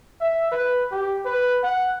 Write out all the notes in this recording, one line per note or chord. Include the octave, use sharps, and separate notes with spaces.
E5
B4
G4
B4
F#5